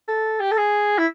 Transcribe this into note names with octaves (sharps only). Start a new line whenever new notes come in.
A4
G4
A4
G#4
E4